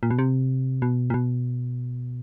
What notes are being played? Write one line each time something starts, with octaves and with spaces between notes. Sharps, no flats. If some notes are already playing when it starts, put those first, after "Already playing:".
A#2
B2
C3
B2
A#2
B2